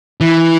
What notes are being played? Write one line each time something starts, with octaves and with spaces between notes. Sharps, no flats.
E3